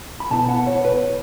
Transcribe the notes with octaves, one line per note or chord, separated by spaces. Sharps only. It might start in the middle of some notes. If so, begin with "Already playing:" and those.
B5
B2 B3 E4 A5
F#5
C#5
B4